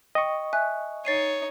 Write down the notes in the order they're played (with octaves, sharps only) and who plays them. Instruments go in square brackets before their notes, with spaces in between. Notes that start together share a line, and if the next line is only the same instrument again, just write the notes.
[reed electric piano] D#5 C#6 [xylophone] G5
[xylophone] E5 G#5 F#6
[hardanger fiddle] D#4 C#5 [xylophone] A6 C7 D#7